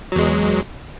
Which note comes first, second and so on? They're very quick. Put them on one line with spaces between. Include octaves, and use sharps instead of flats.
F#3 E2 G#3